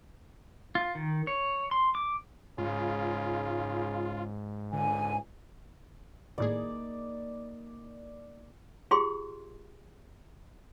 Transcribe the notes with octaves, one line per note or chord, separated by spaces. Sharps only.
F4
D#3
C#5
C6
D6
G#2 C#3 F4
C#2 D3 G#5
G#1 A2 A#3 D#4 G#4 D5
F4 G4 G#4 G5 C6